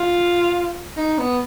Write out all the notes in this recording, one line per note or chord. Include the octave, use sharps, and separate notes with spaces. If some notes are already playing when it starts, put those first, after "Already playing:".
Already playing: F4
D#4
B3